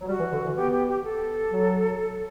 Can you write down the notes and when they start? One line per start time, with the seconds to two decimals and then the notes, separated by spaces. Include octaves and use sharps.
0.01 F#3
0.07 G3 F#4
0.20 E3
0.33 D3
0.44 E3
0.56 B3 G4
0.72 G4
0.88 G4
1.04 A4
1.52 F#3